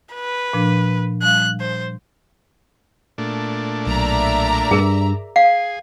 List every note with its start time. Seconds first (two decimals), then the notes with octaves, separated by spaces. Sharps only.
0.15 B4
0.53 A#2 F3 D4
1.22 G3 F5 F#6
1.60 C5
3.18 A#2 A3 D4
3.87 B1 D5 E5 A#5
4.71 G2 G#4 A#4
5.36 G#4 F5 C7